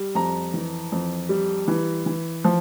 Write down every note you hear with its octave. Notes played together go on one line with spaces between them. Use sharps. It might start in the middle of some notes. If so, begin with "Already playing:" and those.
Already playing: G3
F2 A#5
E3
F2
G3
E3
E3
F3